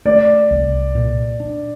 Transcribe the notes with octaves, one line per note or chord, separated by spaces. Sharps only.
A3 D5
C2
A#2
D4